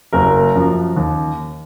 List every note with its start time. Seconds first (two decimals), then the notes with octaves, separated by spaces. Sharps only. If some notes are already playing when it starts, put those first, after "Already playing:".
0.13 F#1 A#4
0.55 F#2 F3
0.97 D#2